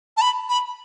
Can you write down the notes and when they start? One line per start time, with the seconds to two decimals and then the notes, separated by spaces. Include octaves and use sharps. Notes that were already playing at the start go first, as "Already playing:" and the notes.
0.17 A5
0.21 B5
0.49 B5